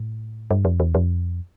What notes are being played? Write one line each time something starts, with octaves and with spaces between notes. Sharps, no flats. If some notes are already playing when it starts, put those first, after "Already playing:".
Already playing: A2
G2
F2
E2
F2